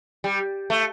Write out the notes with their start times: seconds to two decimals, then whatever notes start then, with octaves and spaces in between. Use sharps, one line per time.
0.24 G3
0.70 A3